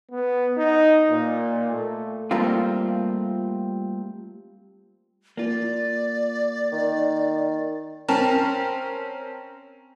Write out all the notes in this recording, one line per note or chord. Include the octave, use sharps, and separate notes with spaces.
B3
D#4
A#2
A3
G3 A3 A#3 C4 F4
A#3 F4 D5
D#3
C4 C#4 A#4 A5